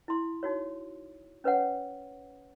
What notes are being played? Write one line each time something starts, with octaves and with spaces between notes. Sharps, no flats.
E4 C6
D#4 F#4 C#5
C#4 B4 C#5 F#5